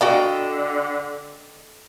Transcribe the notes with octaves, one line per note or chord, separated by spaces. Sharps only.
D3 F#4 A4 D5 D#5 F5 G5